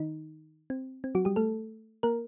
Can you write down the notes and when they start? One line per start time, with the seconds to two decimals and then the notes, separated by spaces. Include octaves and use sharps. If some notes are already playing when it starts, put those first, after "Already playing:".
Already playing: D#3 D#4
0.70 C4
1.04 C4
1.15 F#3 F#4
1.25 G3 G4
1.36 A3 A4
2.03 A#3 A#4